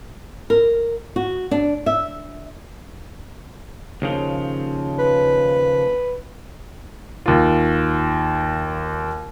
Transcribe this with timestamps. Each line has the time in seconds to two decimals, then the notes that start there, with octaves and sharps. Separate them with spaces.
0.50 A#4
1.16 F#4
1.51 D4
1.86 E5
4.02 D#2 C#3 F3
4.99 B4
7.26 D#2 F4